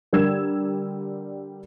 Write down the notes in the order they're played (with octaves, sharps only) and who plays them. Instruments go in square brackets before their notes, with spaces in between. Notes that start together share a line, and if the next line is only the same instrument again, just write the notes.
[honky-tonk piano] D3 G3 A#4 E6 G#6 E7